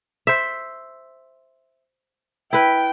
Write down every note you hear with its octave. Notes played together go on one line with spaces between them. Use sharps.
C5 E5
E4 B4 G5